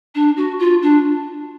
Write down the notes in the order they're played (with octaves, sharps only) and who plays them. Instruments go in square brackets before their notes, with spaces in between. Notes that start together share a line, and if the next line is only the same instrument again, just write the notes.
[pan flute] D4
F#4
F4
D4